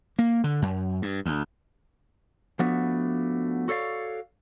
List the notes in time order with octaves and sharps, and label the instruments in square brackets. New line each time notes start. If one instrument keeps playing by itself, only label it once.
[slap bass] A#3
D3
F#2
G2
D2
[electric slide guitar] F3 A3 B3 D4 F#4
F#4 A4 C#5 D5 F5